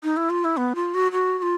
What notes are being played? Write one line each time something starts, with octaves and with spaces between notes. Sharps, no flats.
D#4
E4
F4
E4
B3
F4
F#4
F#4
F#4
F4